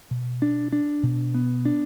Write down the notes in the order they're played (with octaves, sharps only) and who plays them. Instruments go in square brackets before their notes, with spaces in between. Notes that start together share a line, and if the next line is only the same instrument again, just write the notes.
[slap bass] B2
D4
D4
B2
B3
D4